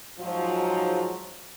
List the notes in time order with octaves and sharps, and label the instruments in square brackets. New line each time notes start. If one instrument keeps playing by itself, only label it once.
[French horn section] G#2 F3 F#3